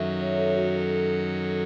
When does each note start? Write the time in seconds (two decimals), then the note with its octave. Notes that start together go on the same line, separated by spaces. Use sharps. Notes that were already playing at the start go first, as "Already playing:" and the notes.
Already playing: F#2 D#3 F#3 C#4 A4 E5
0.21 C#5
0.38 A4
0.56 F#4
0.74 A4